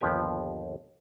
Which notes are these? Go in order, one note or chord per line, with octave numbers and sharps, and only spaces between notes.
G1 D#2 F3 B3 G4 G#5